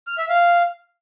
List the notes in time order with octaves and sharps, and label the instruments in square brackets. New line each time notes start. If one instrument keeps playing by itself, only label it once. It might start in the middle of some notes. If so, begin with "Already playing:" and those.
[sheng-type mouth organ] F6
E5
F5